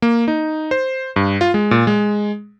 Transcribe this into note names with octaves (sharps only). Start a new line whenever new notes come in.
A#3
D#4
C5
G2
F4
G#3
A#2
G#3